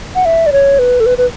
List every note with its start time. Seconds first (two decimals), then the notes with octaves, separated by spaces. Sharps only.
0.15 F#5
0.25 E5
0.46 D5
0.52 C#5
0.79 B4
1.00 A4
1.06 B4
1.18 B4